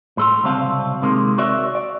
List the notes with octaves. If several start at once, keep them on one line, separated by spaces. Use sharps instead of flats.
A2 A4 C6
C2 C#3 F#3 C4 F5 A5
C3 D#3 G#3 A#3
F#4 A#4 C#5 D5 E5
D5